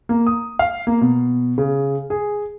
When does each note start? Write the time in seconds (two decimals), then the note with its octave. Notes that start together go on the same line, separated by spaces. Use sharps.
0.09 A#3
0.27 D#6
0.59 F5
0.87 A#3
1.01 B2
1.58 C#3
2.10 G#4